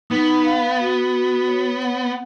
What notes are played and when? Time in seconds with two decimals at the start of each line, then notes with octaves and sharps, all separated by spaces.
0.10 B3 D#4
0.44 F5
0.79 F#4
1.13 F#4
1.47 C#5
1.82 F#5